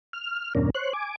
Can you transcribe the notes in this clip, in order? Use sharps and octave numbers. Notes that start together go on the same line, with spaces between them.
F6
E2 G2 B2 C#4 D4 A#4
C5 C#5 F#6
G#5 D6